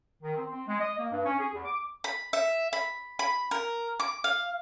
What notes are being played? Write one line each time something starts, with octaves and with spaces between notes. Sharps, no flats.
D#3
C4
C4
G#3
D#5
A#3
G2
C#4
G#4
E2
D6
B5
E5
B5
B5
A#4
D6
F5